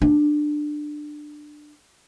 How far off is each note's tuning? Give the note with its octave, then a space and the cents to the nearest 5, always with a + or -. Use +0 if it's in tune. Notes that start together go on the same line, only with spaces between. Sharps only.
D4 +20